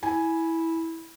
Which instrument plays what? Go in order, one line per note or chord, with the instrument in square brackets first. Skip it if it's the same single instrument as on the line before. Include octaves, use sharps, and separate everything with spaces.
[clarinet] E4 [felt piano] G#5